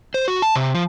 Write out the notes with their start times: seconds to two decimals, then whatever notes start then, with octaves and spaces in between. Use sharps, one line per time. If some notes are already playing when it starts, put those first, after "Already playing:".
0.14 C5
0.28 F#4
0.42 A5
0.56 C3
0.75 F3